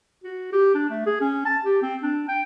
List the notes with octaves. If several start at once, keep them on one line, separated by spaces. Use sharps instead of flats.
F#4
G4
D4
A3
G#4
C#4
A5
G4
C4
D4
G5